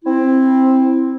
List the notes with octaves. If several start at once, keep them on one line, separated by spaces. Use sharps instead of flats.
C4 E4